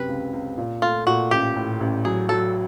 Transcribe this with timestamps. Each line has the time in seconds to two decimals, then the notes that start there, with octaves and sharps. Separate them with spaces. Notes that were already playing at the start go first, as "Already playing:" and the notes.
Already playing: F#2 C3 B4
0.08 C#2
0.33 C#2
0.58 A#2
0.82 A3 F4
1.07 A#2 F#4
1.31 A1 G4
1.56 A2
1.80 A1
2.05 F#3 G#4
2.29 F#3 A4